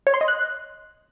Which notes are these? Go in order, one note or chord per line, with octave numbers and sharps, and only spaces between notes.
C#5
C6
D#5
F#6